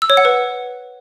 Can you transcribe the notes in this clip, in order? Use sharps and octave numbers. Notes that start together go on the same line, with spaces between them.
E6
C#5
F#5
B4